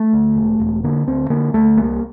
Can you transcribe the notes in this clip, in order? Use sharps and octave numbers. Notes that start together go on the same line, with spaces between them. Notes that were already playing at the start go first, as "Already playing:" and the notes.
Already playing: A3
D2
E1
E1
D3 A#3
D2 C4
D3 A#3
D2 A3
C2 A#3